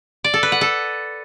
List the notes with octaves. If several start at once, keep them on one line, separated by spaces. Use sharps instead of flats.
D5
A4
B4
F#5
A4